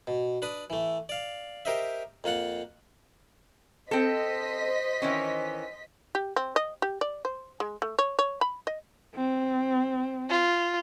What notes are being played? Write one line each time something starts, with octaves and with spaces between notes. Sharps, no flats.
B2
D4 B4 D#6
E3 A3
D5 F5
G4 A#4 C5 D#5 E5
F2 A#3 F4 F#5
C4 A4 C5 D#5 B6
D#3 E3 C#4
G4
C4
D#5
G4
D5
C5
G#3
A3
C#5
C#5
B5
D#5
C4
F4